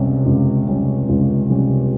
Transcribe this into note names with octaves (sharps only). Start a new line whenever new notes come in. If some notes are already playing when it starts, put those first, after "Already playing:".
Already playing: C#2 C3 G3 C#4
C#2
C3 G3 C#4
C#2
C3 G3 C#4